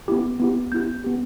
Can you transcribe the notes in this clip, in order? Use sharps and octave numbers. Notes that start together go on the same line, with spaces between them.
B3 E4 G4
B3 E4 G4
B3 E4 G4 G6
B3 G4